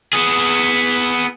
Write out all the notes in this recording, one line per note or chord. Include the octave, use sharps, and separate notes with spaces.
B3 G#4